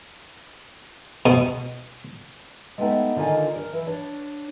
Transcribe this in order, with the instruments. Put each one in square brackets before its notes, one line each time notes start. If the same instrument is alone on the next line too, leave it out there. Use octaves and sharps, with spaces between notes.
[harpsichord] B2
[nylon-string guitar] G#3 A3 B3 D#4 B4 G5
D3 D#3 F4 A4 F5 G#5
A#4
E3
D4 C#5